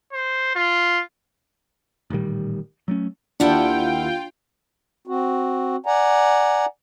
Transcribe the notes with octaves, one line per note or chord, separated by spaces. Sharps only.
C5
F4
A1 A#2 D#3 G3
F#3 A3 C#4
D#2 D4 E4 F4 F#5 G5
C4 F#4
D5 F#5 G#5 A#5